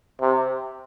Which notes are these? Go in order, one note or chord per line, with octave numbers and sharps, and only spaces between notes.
C3